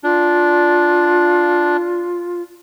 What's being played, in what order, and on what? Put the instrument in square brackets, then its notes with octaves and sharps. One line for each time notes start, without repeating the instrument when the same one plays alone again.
[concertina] D4 [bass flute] F4